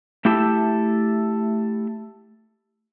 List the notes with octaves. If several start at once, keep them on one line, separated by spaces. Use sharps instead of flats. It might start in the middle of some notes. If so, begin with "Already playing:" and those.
A3 E4 G4 A4 E5 A5